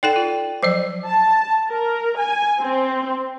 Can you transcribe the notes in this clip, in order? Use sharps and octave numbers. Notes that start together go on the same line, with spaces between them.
D#4 A4 D5 F#5 G5
F4
F3 F#3 C5 D5
A5
A#4
G#5
C4